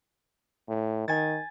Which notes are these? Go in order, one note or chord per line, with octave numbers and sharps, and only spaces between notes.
A2
D#3 G#5 A6